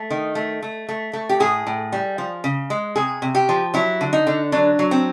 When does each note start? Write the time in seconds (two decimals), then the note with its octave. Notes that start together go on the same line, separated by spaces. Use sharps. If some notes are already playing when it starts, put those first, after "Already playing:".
Already playing: A3
0.10 D#3
0.35 A3
0.63 A3
0.89 A3
1.13 A3
1.29 G4
1.40 A2 G#4
1.67 A2
1.92 G3
2.18 F3
2.44 C#3
2.70 G#3
2.96 C3 G#4
3.22 C3
3.35 G4
3.49 F3
3.74 F#3 E4
4.01 D3
4.13 D#4
4.27 D3
4.52 F#3 D4
4.79 F#3
4.91 C4